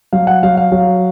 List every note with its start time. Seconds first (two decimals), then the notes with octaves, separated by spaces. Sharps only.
0.13 F#3 F5
0.27 F#5
0.43 F#3 F5
0.57 F5
0.72 F#3